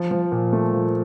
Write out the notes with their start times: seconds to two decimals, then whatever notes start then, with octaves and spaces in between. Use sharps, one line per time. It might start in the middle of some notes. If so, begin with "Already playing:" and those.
Already playing: F3
0.11 F3
0.32 A#2
0.53 A3
0.73 F3